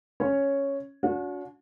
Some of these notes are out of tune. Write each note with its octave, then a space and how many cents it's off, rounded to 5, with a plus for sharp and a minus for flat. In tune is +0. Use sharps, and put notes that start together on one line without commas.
C#4 +0 C#5 +0
D4 -45 F#4 -30